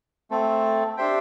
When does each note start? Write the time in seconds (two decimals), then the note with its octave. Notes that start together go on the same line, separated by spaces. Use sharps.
0.31 A3 C4 A4
0.97 D4 G4 C5 E5 G5